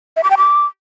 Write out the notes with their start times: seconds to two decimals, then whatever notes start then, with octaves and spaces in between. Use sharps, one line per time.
0.17 E5
0.23 D6
0.30 G5
0.37 D6